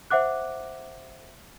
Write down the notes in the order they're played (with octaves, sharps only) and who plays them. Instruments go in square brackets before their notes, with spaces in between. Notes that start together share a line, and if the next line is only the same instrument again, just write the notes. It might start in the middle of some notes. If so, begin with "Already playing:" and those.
[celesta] C5 E5 F#5 D6 F#6